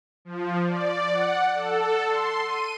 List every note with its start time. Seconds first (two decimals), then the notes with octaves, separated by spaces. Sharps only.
0.25 F3
0.66 D5
1.11 F#5
1.55 A4
2.07 C6
2.46 D#7